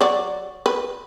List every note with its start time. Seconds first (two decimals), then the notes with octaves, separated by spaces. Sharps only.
0.01 F#3 D5
0.66 B4